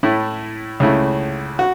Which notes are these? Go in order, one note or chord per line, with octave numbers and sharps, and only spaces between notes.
A2 A3 E4
C#2 C#3 A3 E4
F#4